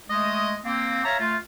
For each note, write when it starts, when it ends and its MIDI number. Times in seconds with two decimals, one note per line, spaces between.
0.10 0.54 56
0.10 0.54 57
0.10 0.54 75
0.66 1.01 58
0.66 1.01 60
1.05 1.16 73
1.05 1.16 76
1.05 1.16 77
1.05 1.16 81
1.05 1.16 82
1.20 1.36 57
1.20 1.36 65